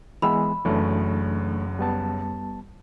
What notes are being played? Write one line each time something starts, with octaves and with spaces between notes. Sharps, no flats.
E3 G#3 B3 B5 E6
F#1 F#2 E3 A3 D4
G3 B3 A5